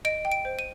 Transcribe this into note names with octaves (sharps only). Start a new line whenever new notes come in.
D#5 D7
G5
D7
C5
D#7